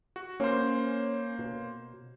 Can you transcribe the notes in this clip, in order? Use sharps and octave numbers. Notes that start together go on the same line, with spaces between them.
F#4
A#3 C#4 C5
B2